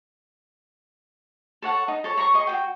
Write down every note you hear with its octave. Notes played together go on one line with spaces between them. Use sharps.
A4 C#5 F#5 A5
D#4
A4 C#5 A5
C#5 A#5 C6 C#6
G#4 D#5 C#6
F#4 G#4 G5